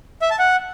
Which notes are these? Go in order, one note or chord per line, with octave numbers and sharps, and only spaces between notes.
E5
A5
F#5